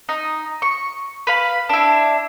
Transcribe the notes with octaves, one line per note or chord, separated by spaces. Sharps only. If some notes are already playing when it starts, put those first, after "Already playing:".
D#4
C#6
B4 F5 B5
D4 E4